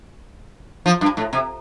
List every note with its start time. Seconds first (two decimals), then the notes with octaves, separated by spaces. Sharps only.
0.86 F3
1.01 G2
1.17 A2
1.33 C3